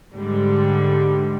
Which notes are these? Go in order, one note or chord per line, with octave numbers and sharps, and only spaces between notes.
G#2 D3 G3